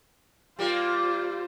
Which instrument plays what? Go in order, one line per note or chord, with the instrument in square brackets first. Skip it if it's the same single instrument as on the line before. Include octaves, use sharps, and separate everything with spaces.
[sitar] G3 A#3 [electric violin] F4 C5